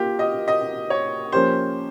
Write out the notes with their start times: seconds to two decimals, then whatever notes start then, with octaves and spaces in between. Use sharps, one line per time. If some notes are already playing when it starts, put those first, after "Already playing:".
Already playing: A#3 F4 G4 A#4
0.19 D#5
0.48 D#5
0.90 C#5
1.32 F3 A#3 C#4 G4 C5